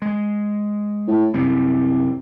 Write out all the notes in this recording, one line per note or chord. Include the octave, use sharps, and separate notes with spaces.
G#3
A2
C2 F#2 C3 G3